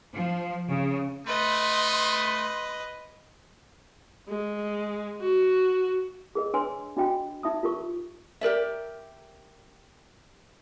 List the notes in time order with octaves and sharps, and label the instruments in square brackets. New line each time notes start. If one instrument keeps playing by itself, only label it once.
[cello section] F3
C#3
[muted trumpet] A3 [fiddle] B4 D#5 [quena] C6
[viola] G#3
F#4
[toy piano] G#4 A#4 D#5
D4 B4 C#5 G#5 C6 E6
D4 F#4 D#5 G5 B5
D#4 E5 B5 D#6
F4 G4 A#4 C#6
[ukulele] G4 A#4 D5 E5